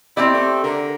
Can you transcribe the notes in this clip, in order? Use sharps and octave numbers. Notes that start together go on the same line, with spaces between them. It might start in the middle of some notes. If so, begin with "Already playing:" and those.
C4 E4 G4 D5
A3
D3 A#4